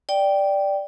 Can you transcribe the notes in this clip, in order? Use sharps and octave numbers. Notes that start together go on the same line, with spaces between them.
D5 G5